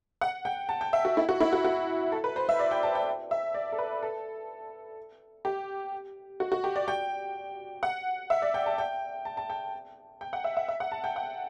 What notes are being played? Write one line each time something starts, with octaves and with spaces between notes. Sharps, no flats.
F#5
G5
A5
G5
E5
F#4
E4
F#4
E4
F#4
F#4
A4
B4
C5
E5
D5
G5
A5
G5
E5
D5
A4
B4
A4
G4
F#4
F#4
G4
D5
G5
F#5
E5
D5
G5
A5
G5
A5
A5
G5
G5
F#5
E5
E5
E5
F#5
A5
G5
F#5